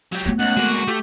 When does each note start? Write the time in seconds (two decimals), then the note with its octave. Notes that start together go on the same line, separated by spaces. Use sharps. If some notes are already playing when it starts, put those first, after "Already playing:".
0.12 F#3 G4
0.26 A3 B3
0.39 C#2 F#5
0.57 G#3 A#3 F#4
0.88 A3 G4